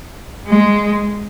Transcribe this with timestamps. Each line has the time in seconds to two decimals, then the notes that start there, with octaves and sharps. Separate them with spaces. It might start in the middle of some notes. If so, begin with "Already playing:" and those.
0.47 G#3